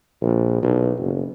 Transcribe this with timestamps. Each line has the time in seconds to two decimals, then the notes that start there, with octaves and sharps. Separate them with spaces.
0.22 A#1
0.62 B1
0.99 F#1